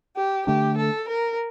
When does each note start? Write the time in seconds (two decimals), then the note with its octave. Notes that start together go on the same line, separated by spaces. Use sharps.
0.16 G4
0.46 D3 A3 D4 G4
0.76 A4
1.07 A#4